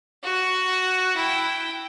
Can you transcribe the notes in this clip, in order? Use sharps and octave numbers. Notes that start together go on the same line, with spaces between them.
F#4 F#5
E4 G5